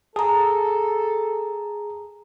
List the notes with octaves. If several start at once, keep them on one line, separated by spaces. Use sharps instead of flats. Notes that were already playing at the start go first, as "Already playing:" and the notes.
G#4 A4 A5 A#5